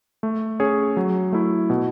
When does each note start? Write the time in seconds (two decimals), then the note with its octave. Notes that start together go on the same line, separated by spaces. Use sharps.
0.23 A3
0.60 C#4 G#4 C#5
0.97 F#3
1.32 A3 E4
1.70 B2